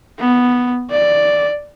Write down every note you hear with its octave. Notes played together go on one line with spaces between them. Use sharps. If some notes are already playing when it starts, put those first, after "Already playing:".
B3
D5